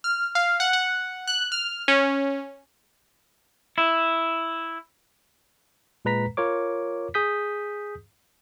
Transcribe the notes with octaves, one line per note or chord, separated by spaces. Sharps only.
F6
F5
F#5
F#5
F#6
F6
C#4
E4
A#2 G#3 B4 A#5 B6
F4 A#4 C#5 D6
G#4 D#6 G6 B6